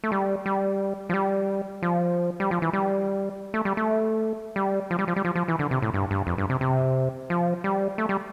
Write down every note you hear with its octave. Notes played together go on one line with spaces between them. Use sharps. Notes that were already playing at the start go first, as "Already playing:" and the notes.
A3
G3
G3
F3
G3
F3
G3
F3
E3
G3
A3
G3
A3
G3
F3
G3
F3
G3
F3
F3
E3
D3
C3
A2
G2
G2
F2
G2
C3
C3
F3
G3
A3
G3